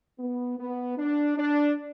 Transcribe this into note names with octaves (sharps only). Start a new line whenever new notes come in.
B3
B3
D4
D4